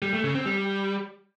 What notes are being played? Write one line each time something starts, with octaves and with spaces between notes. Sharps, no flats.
G3
A3
C#3
C4
G3